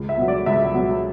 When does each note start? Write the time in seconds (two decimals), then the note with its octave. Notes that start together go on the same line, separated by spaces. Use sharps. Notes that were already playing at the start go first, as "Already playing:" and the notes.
Already playing: C#2
0.09 E5
0.18 B2 F#3
0.28 D5
0.46 C#2 E5
0.74 B2 F#3